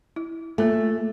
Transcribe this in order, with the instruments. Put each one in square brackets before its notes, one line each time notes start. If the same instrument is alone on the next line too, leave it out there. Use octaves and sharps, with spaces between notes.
[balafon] E4
[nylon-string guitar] A3 [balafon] A#3 F4 A4